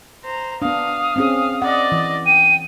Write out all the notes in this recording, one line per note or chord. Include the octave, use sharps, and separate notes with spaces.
C5 A#5
B3 D4 F5 D#6
C4 C#4 G#4
D5 D#5 F#5
E3
G5 D#7